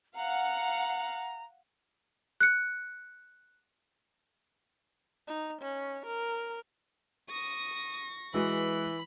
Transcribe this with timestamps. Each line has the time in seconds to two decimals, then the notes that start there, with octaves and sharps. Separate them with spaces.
0.15 F5 F#5 A#5
2.40 F#6 C#7
5.28 D#4
5.61 C#4
6.06 A#4
7.30 C#6 D#6 A#6
8.34 E3 G#3 F#4 B4 B5